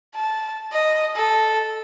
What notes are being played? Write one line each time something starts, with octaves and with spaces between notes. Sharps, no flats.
A5
D#5
A4